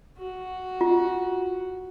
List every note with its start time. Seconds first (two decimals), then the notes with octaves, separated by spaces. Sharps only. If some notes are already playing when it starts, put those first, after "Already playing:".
0.18 F#4
0.81 F4